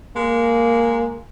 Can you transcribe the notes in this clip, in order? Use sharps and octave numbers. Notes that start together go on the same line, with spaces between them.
G#3 A#3